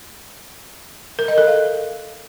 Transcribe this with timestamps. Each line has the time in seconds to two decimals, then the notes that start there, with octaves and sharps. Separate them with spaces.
1.19 A#4
1.28 D#5
1.38 A4
1.47 F5